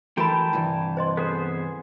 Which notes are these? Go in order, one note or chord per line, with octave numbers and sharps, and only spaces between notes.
E3 A3 F#4 A#4 G5 A5 B5
C2 G2 E3
C5 D#5 C6
B3 G#4 A4 C5